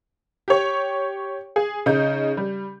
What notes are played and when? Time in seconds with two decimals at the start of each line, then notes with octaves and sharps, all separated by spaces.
0.48 G4 C#5
1.56 G#4
1.86 C#3 D#4 G6
2.37 G3